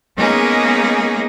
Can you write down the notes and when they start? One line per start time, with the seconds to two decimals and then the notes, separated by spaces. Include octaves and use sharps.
0.17 G#3 A#3 B3 C#4 D#4 G#4